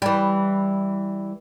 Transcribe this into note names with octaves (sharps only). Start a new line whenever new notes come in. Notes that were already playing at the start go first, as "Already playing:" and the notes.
E3 G3